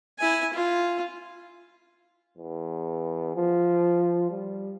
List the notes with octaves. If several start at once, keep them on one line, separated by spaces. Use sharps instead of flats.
E4 G#5
F4
E2
F3
G3